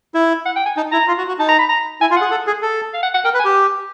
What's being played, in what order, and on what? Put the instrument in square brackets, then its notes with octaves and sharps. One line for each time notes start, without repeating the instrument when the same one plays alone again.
[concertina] E4
[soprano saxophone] F#5
G5
G#5
[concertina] D#4 [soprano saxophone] A5
[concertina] E4 [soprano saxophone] A#5
[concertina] F4
F#4
F#4
[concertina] D#4 [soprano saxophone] A5
[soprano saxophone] A#5
B5
A#5
[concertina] E4 [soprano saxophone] G#5
[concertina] F4
[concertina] G#4 [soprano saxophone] F#5
[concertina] A4
G#4
A4
[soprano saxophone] F5
F#5
F#5
[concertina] A#4 [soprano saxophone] G5
[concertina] B4
[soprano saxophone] G#5
[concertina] G4